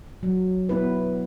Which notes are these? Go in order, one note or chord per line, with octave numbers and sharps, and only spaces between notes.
F#3
B3 E4 B4